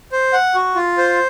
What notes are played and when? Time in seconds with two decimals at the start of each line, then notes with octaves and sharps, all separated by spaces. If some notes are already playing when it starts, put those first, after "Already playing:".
0.12 C5
0.33 F#5
0.55 F#4
0.76 F4
0.98 C5